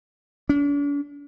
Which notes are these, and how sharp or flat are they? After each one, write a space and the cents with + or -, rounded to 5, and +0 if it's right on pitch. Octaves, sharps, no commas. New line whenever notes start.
D4 -45